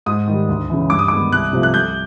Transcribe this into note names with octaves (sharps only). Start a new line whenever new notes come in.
G#2 D#6
D#3 G3
D2
C#3 E3
G2 D6
D#6
D#3 G#3 B3 D6
C2 F#6
C3 F3 A3
F#6
C2 G6